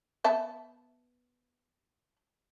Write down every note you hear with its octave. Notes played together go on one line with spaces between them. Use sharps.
B3 E5 A5